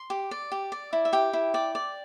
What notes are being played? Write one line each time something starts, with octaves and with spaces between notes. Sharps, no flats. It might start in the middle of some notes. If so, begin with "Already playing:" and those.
Already playing: C6
G4
D5
G4
D5
E4
E5
G4 G5
E4
D5 G5
D5